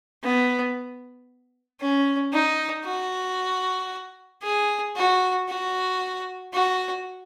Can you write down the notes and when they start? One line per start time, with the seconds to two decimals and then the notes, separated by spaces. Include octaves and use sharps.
0.23 B3
1.81 C#4
2.33 D#4
2.85 F#4
4.43 G#4
4.96 F#4
5.48 F#4
6.53 F#4